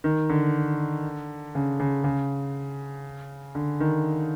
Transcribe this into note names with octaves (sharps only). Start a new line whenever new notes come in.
D#3
D3
C#3
C#3
C#3
D3
D#3